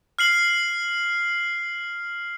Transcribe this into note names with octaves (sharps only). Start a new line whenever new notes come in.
F6 C7 F#7